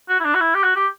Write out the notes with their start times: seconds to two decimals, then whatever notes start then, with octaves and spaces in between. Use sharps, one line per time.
0.09 F#4
0.20 E4
0.25 D4
0.34 F#4
0.40 E4
0.55 G4
0.63 F#4
0.76 G4